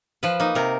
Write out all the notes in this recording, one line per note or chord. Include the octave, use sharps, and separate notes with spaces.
F3 B4
A#3 D#4
C3 A#4